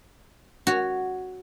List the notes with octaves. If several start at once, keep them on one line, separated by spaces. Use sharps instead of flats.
F#4 C#5